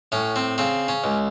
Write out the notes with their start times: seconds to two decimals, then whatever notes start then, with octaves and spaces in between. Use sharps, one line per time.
0.12 A2 C#4
0.36 C4
0.58 C#3 C4
0.88 C#4
1.04 C#2